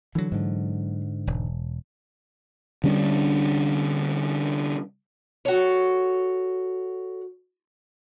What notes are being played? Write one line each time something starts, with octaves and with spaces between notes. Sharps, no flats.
D3 E3 F#3
G#2 D3
E1
D3 G3 C#4 D4
F#4 A4 C#5